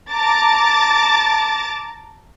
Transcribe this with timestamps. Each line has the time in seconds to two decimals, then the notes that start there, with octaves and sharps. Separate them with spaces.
0.11 A5 A#5 D6 A6